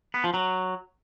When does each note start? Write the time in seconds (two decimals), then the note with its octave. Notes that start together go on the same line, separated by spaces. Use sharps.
0.14 B3
0.24 F3
0.34 F#3